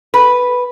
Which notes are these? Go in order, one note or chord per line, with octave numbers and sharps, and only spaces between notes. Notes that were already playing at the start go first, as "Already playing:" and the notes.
B4